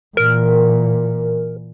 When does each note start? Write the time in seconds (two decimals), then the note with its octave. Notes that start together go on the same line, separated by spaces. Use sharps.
0.17 A#2 E3 A#4